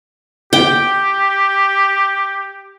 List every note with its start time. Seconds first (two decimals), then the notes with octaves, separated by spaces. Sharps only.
0.53 G4 G5